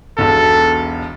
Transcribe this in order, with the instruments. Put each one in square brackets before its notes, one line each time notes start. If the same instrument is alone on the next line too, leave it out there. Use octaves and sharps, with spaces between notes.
[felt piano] E1 B1 [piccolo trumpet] A4